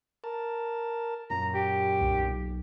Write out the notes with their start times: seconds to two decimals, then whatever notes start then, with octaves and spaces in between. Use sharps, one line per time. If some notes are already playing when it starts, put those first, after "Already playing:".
0.24 A#4 A5
1.30 F#2 A#2 A#5
1.54 G4
2.01 B1